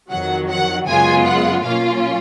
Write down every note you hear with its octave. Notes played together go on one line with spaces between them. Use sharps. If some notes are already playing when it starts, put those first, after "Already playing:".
F2 D#3 F#3 F#5
F#5
F#2 C#3 G#3 B3 F4 G#5
F#5
B2 F#3 A#3 C#4 F4 F5